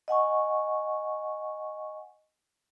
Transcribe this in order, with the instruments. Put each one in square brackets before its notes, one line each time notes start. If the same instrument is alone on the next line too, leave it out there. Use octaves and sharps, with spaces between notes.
[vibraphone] D#5 F#5 G#5 C#6